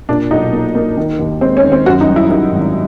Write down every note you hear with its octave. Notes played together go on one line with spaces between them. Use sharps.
A#2 D4
B1 D#4
A#3
A#3
D#3
D#2
G#3 C4
C#4
D#2
C4
F#2 F#4
D#4
G3
E4
D#3 E4
G#1